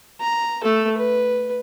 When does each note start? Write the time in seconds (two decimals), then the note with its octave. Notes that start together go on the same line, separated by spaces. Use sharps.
0.21 A#5
0.64 A3 A4
0.98 B4